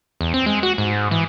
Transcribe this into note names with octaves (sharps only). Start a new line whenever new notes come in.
E2
C4
G#3
F#4
G#2
E3